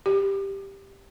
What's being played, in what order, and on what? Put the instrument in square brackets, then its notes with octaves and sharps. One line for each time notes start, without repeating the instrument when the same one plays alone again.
[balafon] G4